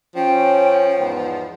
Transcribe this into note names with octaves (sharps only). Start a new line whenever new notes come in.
F3 C#4 G5
E2 G#2 B3